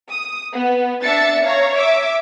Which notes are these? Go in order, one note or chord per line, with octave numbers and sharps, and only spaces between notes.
D#6
B3
D4 E5 A6 C#7
C#5 F5 A#5
E5 D6